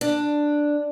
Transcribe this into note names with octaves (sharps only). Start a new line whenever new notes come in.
D4